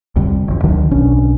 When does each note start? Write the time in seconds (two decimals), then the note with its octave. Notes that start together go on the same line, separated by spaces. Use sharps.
0.16 C2 F2 D3 G3
0.48 F#1 F2
0.64 D2 D3 D#3 F#3
0.91 B1 B2 C#4 D4